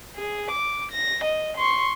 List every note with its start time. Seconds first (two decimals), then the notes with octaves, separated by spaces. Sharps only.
0.15 G#4
0.51 D6
0.92 A#6
1.24 D#5
1.57 C6 C#6